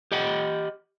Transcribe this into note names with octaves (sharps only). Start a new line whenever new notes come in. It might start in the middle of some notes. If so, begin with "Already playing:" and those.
G4 D#5 F#5 G5